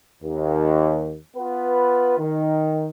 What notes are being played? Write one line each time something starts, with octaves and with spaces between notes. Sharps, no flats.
D#2
B3 F4 B4
D#3